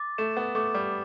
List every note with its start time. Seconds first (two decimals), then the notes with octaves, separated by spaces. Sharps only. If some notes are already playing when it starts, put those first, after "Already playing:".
Already playing: D6 A6
0.18 A3 E7
0.37 B3
0.55 A3 D6
0.74 G3